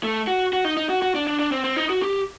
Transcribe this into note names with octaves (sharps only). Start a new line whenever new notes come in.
A3
F#4
F#4
D#4
D#4
F#4
F#4
D4
D4
D4
C4
C4
D#4
F#4
G4